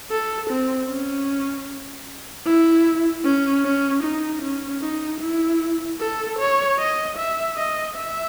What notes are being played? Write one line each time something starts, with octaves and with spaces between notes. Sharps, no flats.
A4
C4
C#4
E4
C#4
C#4
D#4
C#4
D#4
E4
A4
C#5
D#5
E5
D#5
E5